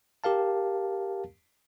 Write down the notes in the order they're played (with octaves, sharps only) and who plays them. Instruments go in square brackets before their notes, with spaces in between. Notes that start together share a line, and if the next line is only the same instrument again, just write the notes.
[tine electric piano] G4 A#4 F5 A5